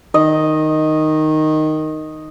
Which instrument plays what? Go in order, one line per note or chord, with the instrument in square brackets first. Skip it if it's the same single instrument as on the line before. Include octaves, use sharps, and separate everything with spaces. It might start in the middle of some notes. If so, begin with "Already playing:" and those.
[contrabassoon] D#3 [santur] D#5